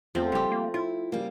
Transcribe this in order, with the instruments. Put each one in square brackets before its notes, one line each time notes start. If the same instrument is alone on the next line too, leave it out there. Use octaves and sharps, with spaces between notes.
[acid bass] E2 [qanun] F3 C4 [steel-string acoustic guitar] A3
[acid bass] F#1 [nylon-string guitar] G3 G4
[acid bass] A#3
[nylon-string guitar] E4 [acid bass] F4
[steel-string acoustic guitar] C#3 G3 [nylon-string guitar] A#3